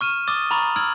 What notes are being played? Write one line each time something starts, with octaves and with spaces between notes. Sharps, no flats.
C#6 F6 D#7 E7
D6 D#6 A6 G7
A#5 B5 C#6 A6
D6 E6 F6 G#6 D7 F#7